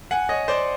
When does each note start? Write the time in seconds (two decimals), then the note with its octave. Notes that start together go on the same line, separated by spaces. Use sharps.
0.11 F#5 G#5
0.29 C#5 D#5
0.48 C5 D5